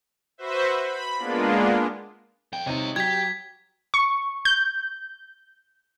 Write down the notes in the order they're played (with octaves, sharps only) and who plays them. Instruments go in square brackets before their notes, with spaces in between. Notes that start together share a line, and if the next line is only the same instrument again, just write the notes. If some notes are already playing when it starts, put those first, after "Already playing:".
[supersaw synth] F#4 B4 C5 E5
B5
G#3 A#3 B3 D4 F4
[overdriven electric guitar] F3 G5
[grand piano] C3 D#4 [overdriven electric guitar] C#5 D#5
[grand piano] F#3 [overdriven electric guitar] G4 G5 [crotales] G#6 B6
[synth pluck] C#6
G6